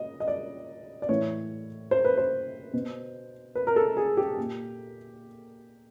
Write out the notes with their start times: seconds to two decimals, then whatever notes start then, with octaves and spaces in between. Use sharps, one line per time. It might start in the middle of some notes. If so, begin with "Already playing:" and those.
Already playing: D#5
0.20 D#5
0.28 D5
1.02 D5
1.09 A2 E3 C#5
1.91 C5
2.05 B4
2.18 C5
2.73 B2
3.55 B4
3.67 A#4
3.76 A4
3.97 G#4
4.17 G4
4.38 A#2